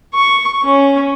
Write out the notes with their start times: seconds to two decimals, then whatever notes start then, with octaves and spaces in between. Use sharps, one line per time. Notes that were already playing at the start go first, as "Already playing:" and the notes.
0.14 C#6
0.64 C#4